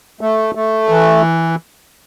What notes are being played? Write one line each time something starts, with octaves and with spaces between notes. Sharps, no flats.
A3
A3
E3